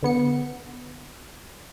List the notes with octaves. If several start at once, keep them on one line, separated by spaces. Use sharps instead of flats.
D3 B3 C#7